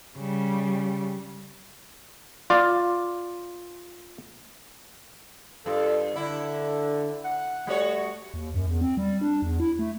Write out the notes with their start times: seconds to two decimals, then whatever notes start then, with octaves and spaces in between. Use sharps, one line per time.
0.17 C#3 G3
2.50 F4 D5
5.66 G2 F4 A4
6.16 D3 E4
7.25 F#5
7.67 G3 A3 F#4 C#5
8.34 D#2
8.54 F#2
8.67 E2
8.81 C4
8.97 G3
9.21 D4
9.42 E2
9.60 E4
9.79 A3